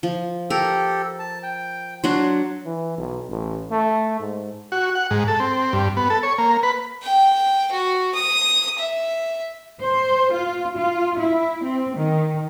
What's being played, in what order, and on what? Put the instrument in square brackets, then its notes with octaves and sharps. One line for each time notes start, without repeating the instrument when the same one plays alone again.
[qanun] F3
[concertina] G4 A4 [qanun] A#4
[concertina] A5
G5
[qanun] F#3 D4 F#4 [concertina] C6
[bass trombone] E3
B1
A1
A3
G#2
[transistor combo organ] F#4
F#5
G#2
A4
C4
G2
B3
A4
C#5
A#3
B4
[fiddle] G5
F#4
D#6
E5
[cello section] C5
F4
F4
E4
C4
D#3